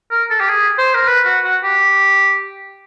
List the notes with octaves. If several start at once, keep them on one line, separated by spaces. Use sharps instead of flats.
A#4
A4
G4
G#4
C5
A#4
B4
F#4
F#4
G4